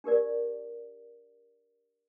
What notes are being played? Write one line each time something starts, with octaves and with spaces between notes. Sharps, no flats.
D4 G4 A#4 D5